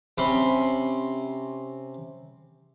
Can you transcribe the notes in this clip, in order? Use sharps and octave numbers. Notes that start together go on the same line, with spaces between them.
C3 C#4 B5 C6